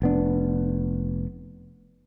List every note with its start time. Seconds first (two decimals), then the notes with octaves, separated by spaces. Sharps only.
0.02 F1 B3 D4